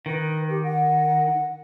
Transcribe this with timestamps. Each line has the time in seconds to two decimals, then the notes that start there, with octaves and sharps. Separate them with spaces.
0.06 D#3 B4
0.48 G4
0.63 F#5